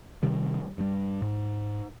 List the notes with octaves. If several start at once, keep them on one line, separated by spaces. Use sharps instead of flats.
C3 D#3 G3
G2 G3
G#2